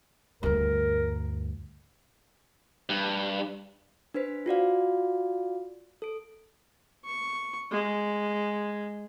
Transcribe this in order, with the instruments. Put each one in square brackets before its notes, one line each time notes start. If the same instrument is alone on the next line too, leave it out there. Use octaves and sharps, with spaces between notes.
[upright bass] D2 G2 [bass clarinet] A#4
[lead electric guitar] G2
[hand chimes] D4 B4 C5 B6
F4 F#4 D5 F5
A4 D7
[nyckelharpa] C#6
G#3